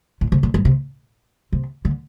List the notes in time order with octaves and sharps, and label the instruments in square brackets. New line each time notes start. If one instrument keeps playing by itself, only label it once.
[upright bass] A#2
C3
A#2
G2
C3
C3
D3